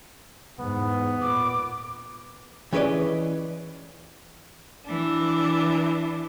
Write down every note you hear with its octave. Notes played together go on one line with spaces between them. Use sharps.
E2 G#2 B3
A#2 D6
E3 C#4 G#4 B4 D5 D#5
E3 D4